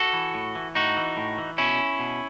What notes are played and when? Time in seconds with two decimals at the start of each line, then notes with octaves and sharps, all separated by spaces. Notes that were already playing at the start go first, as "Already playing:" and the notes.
Already playing: F#4 A4
0.13 E3
0.34 A2
0.55 E3
0.75 A2 D#4 F#4
0.97 E3
1.17 A2
1.38 E3
1.58 B2 C#4 E4
1.99 B2